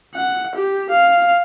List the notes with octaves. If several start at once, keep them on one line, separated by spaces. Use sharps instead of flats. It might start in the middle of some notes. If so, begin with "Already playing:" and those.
F#5
G4
F5